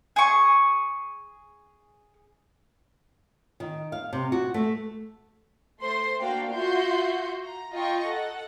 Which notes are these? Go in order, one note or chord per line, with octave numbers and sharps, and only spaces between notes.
G#4 C#6
D#3
F5
C3
F#4
A3
A3 C5 C6
A#3 D4 F#4 F5 G5
F4 F#4 E5 C6 G6
A#5
F4 D#5 G5 A#5 C#6
A4 F#5